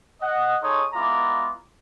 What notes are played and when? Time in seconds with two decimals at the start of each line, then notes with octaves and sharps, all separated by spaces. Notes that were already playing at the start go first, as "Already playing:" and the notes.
0.22 D#5 F#5
0.62 D#4 G#4 A4 C#5 C6 D#6
0.94 G#3 B3 E4 F4 A#5 D6